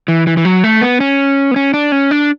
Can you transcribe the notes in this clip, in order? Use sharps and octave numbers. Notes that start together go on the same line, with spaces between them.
E3
E3
E3
F#3
A3
B3
C#4
B3
C#4
D4
C#4
D4